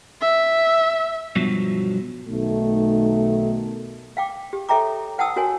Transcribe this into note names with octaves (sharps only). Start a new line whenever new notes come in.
E5
G2 B2 F3 F#3
B1 D#3 A3
F5 G5 D6
G4
A4 C#5 E5 G5 A#5 D6
B4 F#5 G5 A5 D#6 E6
F#4 A#4 C#5 G#5